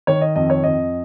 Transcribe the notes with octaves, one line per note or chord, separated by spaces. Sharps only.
D#3 C#5
D#5
F2 D#5
C#5
F2 D#5